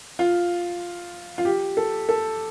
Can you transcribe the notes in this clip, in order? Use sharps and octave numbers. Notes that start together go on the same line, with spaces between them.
F4
F4
G4
A4
A4